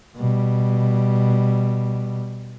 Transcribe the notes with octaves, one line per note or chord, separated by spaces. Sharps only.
B2 G3